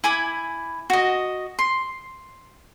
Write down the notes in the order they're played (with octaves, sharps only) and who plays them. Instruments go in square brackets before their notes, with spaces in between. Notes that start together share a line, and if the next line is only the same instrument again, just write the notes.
[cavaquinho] E4 G#5 B5 D6
F#4 D#5
C6